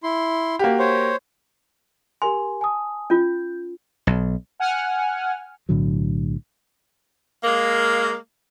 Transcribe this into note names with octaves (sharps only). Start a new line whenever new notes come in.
E4 C6
A#3 F#4 G4
C5 C#5
G4 A#4 G#5 C6
G#5 A5 D#6
C#4 F4 G6
B1
F#5 G#5 F6
B1 A2 D3 F#3
G#3 A#3